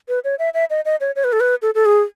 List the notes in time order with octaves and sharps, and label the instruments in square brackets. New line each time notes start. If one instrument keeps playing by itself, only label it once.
[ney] B4
C#5
E5
E5
D#5
D#5
C#5
C#5
B4
A4
B4
A4
A4
G#4